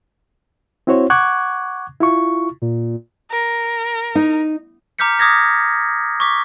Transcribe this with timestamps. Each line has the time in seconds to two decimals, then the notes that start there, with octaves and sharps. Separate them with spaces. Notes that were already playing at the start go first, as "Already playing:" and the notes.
0.87 C4 E4 F#4 C5 C#5
1.10 F#5 C#6 D6 F#6 G#6
2.00 E4 F4 C#6
2.62 A#2
3.31 A#4
4.15 D#4
4.99 A#5 D6 F6 G6 B6 C#7
5.19 D6 D#6 F6 G#6 A#6 B6
6.20 C#6 D6 B6